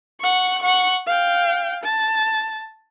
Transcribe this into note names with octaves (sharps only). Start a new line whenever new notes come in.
F#5 C#6
F#5 C#6
F5 G5
A5